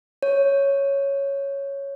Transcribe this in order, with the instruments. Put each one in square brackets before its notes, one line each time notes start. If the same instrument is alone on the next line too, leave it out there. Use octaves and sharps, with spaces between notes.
[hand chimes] C#5